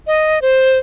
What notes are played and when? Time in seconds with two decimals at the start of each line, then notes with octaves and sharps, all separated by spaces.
0.07 D#5
0.42 C5